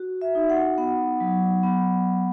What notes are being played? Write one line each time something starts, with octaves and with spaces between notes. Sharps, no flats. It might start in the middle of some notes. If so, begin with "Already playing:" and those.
Already playing: F#4
E5
D#4
F#5
B3 F#5
F#3
B3